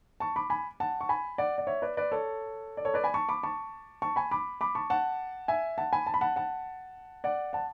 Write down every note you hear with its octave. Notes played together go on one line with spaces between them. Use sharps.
A5 C#6
B5 D6
G#5 B5
F#5 A5
C#6
G#5 B5
D5 F#5
D5
C#5 E5
B4 D5
B4 D5
A4 C#5
D5
A4 C#5
B4 D5
G#5 B5
A5 C#6
B5 D6
A5 C#6
A5 C#6
G#5 B5
B5 D6
B5 D6
A5 C#6
F#5 A5
E5 G#5
F#5 A5
G#5 B5
A5
B5
F#5 A5
F#5 A5
D5 F#5
F#5 A5